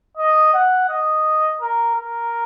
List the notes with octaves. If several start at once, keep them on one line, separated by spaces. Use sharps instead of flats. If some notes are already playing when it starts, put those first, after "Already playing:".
D#5
F#5
D#5
A#4
A#4